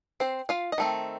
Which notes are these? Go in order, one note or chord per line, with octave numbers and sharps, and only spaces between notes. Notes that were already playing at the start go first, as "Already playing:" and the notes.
C4 C5
F4 F5
D#5
D#3 A3 C4